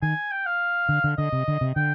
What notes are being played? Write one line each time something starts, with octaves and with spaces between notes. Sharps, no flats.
D#3 G#5
G5
F5
D3
D3
D3 D#5
C3
D3
C3
D3 G5